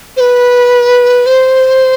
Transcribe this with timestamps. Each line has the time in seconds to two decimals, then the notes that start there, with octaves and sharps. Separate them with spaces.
0.17 C5
0.20 B4
1.26 C5